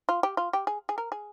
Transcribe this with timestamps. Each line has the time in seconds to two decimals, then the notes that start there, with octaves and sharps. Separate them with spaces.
0.09 F4
0.23 G4
0.37 F4
0.53 G4
0.67 G#4
0.89 G#4
0.98 A#4
1.12 G#4